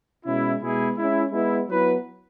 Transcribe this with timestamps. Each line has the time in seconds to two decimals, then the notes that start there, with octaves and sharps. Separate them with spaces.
0.26 B2 G#3 C#4 E4
0.61 B2 G#3 B3 E4 G#4
0.97 G#3 C#4 E4
1.32 G#3 B3 E4
1.68 F#3 B3 E4 B4